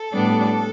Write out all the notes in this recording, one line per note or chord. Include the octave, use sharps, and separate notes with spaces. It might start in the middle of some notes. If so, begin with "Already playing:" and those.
Already playing: A4
A2 G3 B3 D4